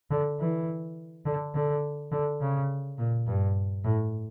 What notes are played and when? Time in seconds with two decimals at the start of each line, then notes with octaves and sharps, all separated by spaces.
0.10 D3
0.39 E3
1.25 D3
1.55 D3
2.12 D3
2.41 C#3
2.98 A#2
3.27 G2
3.84 A2